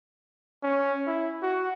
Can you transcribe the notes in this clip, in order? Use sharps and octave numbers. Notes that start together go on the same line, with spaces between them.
C#4
E4
F#4